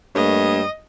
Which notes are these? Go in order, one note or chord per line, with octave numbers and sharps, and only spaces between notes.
G2 A3 A#3 C#5 D#5